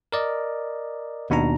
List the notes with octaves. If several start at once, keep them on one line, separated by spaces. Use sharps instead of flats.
A#4 D5 D#5
D#2 B2 D4 D#4 A#5